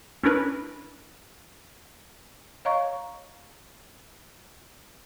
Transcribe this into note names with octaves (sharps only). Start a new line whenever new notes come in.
C#4 D4 E4 A#4 B4
C#5 D#5 F5 A#5 C#6